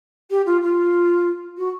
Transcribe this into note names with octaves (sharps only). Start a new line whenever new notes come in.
G4
F4
F4
F#4